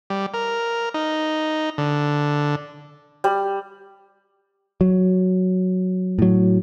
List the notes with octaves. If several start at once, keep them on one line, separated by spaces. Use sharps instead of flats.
G3
A#4
D#4
D3
G3
F#3
A2 F#3